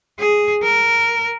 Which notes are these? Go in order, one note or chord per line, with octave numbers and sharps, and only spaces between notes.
G#4
A#4